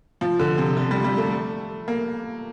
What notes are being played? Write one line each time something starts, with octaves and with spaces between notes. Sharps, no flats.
F3
D3
C3
D3
G3
G3
A3
A#3